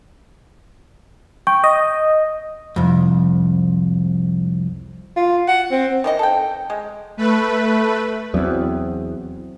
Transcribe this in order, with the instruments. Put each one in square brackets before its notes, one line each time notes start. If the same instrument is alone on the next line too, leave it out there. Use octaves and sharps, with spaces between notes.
[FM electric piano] G5 [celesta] C#6
[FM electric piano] D#5
[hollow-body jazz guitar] C2 F2
[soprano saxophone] F4
F#5
C4
[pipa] D#3 E3 D#5
A4 G5
G#3
[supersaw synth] A3 B4
[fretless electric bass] E2 [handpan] F#3 C4